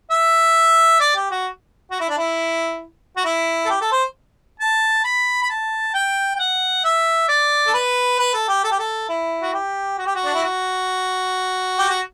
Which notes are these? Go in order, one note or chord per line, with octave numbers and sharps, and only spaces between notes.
E5
D5
G4
F#4
F#4
E4
D4
E4
F#4
E4
A4
G4
A4
C5
A5
B5
B5
A5
G5
G5
F#5
E5
D5
A4
B4
B4
A4
G4
A4
G4
A4
E4
F#4
G4
F#4
G4
F#4
D4
E4
F#4
G4
F#4